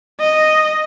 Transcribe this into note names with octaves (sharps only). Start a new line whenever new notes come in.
D#5